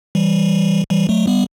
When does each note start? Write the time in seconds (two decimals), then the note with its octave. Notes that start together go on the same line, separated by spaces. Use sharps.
0.15 E3 G3
0.90 E3 G3
1.09 F#3 A3
1.27 G3 B3